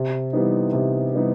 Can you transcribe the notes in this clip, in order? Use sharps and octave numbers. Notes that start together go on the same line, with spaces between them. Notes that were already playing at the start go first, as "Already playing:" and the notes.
Already playing: C3
E3 G3 B3 D#4
C3
E3 G3 B3 D#4